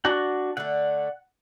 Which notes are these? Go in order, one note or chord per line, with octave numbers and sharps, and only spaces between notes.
D4 F#4 F#5
D3 A3 F#5